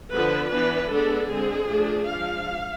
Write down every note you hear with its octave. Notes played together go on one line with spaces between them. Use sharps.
D3 F3 B3 B4
E3 B3 D4 B4
G#3 B3 D4 A4
D3 G#3 C4 G#4
F3 A3 D4
F3 G#3 D4 F5